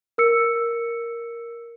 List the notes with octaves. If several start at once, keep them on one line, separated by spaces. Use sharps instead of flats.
A#4 E6 C#7